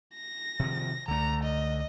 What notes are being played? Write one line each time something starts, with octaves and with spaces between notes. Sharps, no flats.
A#6
C3 D#3 F3
C#2 D3 A3 A#5
D#5